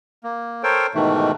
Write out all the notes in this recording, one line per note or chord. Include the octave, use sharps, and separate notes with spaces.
A#3
A4 A#4 C5 C#5 G5
G#2 B2 D#3 E3 A3